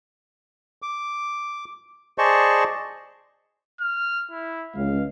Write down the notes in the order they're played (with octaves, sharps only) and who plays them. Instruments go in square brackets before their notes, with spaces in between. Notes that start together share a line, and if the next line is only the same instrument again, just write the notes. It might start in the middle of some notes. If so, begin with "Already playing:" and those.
[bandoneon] D6
G#4 C5 D5 D#5 A5 C#6
[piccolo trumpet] F6
E4
[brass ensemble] C#2 [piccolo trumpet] F5